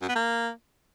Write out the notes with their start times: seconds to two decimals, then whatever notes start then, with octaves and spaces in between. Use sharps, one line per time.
0.02 F#2
0.09 B3
0.15 A#3